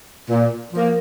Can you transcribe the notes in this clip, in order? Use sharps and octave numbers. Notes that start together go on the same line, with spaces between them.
A#2
F3 A#3